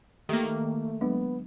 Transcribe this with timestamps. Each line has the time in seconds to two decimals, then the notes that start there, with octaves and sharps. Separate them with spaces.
0.29 D#3 A3 A#3 G4 A4 E5
1.01 F#3 G#3 B3 D4